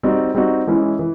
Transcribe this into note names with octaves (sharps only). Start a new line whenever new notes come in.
G3 C4 D#4 F#4
G3 C4 D#4 F#4
E3 G#3 C#4 E4
E3